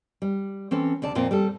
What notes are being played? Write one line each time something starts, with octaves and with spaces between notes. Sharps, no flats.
G3
E3 C4 C#4 A4
D2 C3 D5 A5
F2 A#2 A#3 C4
G3 G4 A4